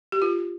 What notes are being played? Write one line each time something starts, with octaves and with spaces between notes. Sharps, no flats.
G4
F4